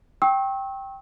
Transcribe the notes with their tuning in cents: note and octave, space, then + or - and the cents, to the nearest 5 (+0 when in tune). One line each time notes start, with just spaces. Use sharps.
G5 +0 C#6 -35 E6 -30